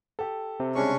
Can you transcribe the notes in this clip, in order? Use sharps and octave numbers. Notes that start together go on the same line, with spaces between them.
G4 A4
C3
C#3 G3 G#3 C#4 D4 C#6